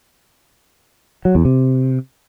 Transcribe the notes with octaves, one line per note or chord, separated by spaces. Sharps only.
F#3
E2
C3